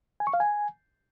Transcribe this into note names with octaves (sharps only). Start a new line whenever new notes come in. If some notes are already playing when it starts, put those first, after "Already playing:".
G#5
C#6
F5
G#5